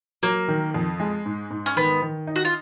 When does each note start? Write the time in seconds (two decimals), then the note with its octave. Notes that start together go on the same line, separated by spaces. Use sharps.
0.23 F#3 A#3
0.48 D#3
0.74 F2
1.00 G#3
1.26 G#2
1.51 G#2
1.66 C#4
1.76 D#3 B3
2.02 D#3
2.27 D#4
2.36 F#4
2.45 F4